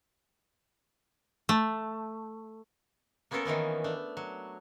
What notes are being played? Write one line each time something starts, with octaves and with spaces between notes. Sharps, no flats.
A3
A#3 B3 C#4 F4 A4 A#4
D#3 E3 A#3 B3
A3 D4
F#3